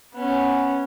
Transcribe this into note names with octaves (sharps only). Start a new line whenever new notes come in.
B3 C#4